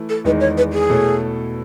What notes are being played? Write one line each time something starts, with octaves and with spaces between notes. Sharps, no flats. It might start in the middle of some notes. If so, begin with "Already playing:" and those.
Already playing: E3 A3 E4
A4
E2 D#3 G#3 D#4 B4
C#5
B4
G#4
B2 A3 E4 A4 C#5